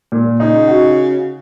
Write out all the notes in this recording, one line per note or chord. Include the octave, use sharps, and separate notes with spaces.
A#2
C#3 D#4
F#4